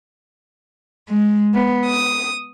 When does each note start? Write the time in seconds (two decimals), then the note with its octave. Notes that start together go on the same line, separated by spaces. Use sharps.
1.10 G#3
1.54 B3
1.86 D#6